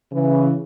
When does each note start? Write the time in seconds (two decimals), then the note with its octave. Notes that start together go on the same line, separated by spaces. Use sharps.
0.12 C#3 E3